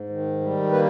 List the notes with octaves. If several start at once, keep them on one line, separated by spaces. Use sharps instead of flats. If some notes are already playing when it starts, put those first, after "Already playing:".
Already playing: G#2
D#3
G3
A#3 B4